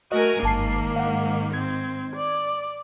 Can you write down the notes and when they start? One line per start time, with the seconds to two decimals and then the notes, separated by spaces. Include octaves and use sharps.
0.12 A3 F#4 A#4 D#5 G#5
0.43 G1 G#2 D#3 A#3 A5 C7
0.96 F5 F#5
1.53 C4 G#6
2.16 D5